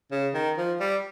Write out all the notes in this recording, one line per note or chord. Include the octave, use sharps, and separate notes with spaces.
C#3
D#3
F3
G3